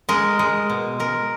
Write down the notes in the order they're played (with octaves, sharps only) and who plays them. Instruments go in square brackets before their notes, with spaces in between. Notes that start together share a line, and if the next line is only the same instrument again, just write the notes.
[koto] G#3 A#4
G#3
B2
G#3 A#4